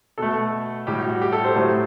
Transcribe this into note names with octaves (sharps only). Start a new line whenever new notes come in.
B2 A3 A4
A2 G3 G4
F#4
F#4
G4
A4
C5
A2 F#3 A3 C5